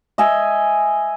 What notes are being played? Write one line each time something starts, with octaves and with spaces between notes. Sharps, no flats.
D#5 E5 G#5